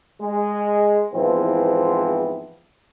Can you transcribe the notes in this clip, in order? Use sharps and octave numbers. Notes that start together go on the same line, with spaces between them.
G#3
E2 G#2 E3 F3 B3 C4